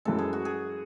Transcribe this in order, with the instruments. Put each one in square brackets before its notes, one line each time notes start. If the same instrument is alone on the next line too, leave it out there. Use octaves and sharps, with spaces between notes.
[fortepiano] F#2 E3 G#3 [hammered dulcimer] A4
[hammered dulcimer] G#4
F#4
G#4